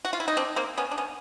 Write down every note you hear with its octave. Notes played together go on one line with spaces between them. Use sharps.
F#4
F4
E4
D#4
C4 D4
A#3 C4
B3 C#4
D4
B3 C#4